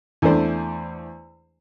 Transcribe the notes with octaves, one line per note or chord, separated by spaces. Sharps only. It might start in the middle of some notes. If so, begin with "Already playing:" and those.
E2 A3 D4 C5 D5